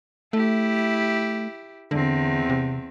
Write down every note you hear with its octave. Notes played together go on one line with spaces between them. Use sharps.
A3 E4 G4
E2 D3 C4
C3